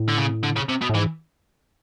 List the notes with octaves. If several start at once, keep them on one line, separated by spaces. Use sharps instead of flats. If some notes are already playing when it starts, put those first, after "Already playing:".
Already playing: A2
D3
C#3
D3
C#3
C3
B2
A2
G#2 E3